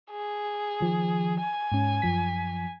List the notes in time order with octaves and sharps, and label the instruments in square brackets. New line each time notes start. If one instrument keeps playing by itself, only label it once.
[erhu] G#4
[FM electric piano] D#3 F3
[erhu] G#5
[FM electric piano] G#2 C#4
F#2 F3 B6